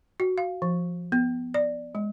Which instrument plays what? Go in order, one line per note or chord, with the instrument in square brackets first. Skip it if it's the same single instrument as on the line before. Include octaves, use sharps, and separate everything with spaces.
[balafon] F#4
F5
F3
B3
D5
G#3